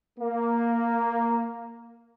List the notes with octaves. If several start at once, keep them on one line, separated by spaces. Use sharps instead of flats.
A#3